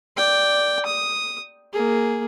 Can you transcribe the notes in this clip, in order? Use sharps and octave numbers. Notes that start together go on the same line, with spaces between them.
D5 G5
D#6
A#3 G#4